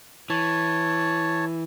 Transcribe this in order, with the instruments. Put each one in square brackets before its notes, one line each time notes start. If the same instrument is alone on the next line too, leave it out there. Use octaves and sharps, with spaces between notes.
[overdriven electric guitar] E3 [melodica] C#5 A5